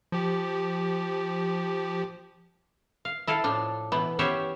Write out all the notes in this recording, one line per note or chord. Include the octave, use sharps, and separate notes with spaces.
F3 G4
F5
E4 A4 F5
A2 F3 D4
B2 E3 B3
B3 C#4 G4 C5 C#5 E5